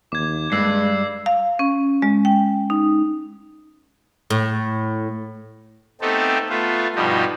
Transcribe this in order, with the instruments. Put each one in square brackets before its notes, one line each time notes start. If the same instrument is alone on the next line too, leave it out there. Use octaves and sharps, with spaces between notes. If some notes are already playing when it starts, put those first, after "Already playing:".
[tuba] D#2 [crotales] D6 G#6
[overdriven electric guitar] G2 [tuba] G#3 [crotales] E6 C7
[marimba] F5
C#4
G#3
G5
D#4
[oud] A2
[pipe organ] A3 B3 C4 D#4 G4 A4
A3 B3 F4
G2 B2 F3 G3 D#4 G4